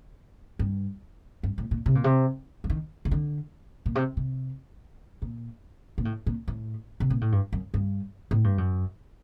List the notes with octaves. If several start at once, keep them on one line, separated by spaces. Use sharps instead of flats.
G2
G2
A2
A#2
C3
A#2
C3
F#3
D#3
C3
D3
A#2
C3
C3
A#2
A#2
A2
A#2
A2
C3
A#2
A2
G2
F#2
G2
A2
G2
F#2